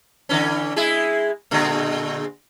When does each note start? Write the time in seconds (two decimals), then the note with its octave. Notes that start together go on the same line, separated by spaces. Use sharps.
0.29 D3 E3 C#4
0.76 G#3 E4 G#4
1.51 A#2 D3 G#3